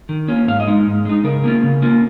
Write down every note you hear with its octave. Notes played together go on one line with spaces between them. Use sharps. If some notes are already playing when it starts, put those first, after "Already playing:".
D#3
A#3 C#4 F4
G#2 F5
D#5
G#3 D#4
G#2
G#3 D#4
C#3 A#4
A#3 C#4 F4
C#3
A#3 C#4 F4